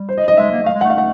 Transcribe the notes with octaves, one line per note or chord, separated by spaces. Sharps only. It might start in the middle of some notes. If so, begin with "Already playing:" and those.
Already playing: G3
C5
D#5
D#5
G#3 E5
A#3
A3 F5
G#3
A3 F#5
F5
A3 F#5